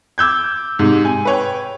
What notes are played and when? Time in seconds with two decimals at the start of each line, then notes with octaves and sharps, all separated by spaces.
0.18 D6 E6 G6 G#6
0.79 G#2 C3
1.05 G#5
1.25 B4 C#5 G5